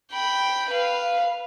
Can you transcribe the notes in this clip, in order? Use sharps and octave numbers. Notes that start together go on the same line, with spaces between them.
G5 B5
B4 F5